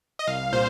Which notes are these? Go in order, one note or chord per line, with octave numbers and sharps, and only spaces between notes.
D#5
C2 F5
A#2 C5